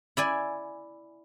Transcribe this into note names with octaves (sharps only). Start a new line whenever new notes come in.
E4 D5 G#5